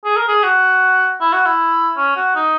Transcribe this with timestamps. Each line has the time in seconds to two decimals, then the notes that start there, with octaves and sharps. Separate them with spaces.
0.04 G#4
0.17 A#4
0.28 G#4
0.43 F#4
1.21 E4
1.33 F#4
1.46 E4
1.97 C#4
2.16 F#4
2.36 D#4